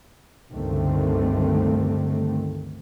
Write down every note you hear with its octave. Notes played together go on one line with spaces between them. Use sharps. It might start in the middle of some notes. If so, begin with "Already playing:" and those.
C#2 G2 D3 D#3 A3 C4